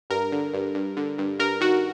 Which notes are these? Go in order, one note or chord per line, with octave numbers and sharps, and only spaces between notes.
G2 A#4
D3
G2
G2
D3
G2
G2 A#4
D#3 F#4